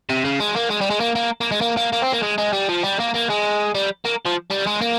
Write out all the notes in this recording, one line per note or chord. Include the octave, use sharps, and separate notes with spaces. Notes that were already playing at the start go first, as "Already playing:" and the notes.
C3
C#3
G#3
A#3
G#3
G3
G#3
A#3
A#3
A#3
G#3
A#3
A#3
A#3
C4
A#3
G#3
G#3
G3
F3
G3
A#3
A#3
G#3
G3
A#3
F3
G3
G#3
A#3